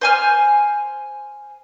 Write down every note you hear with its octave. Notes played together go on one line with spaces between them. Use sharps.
C5 G#5 F6